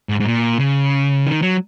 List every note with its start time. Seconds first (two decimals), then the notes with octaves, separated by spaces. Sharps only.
0.09 G#2
0.20 G#2
0.26 A#2
0.60 C#3
1.26 D#3
1.42 F#3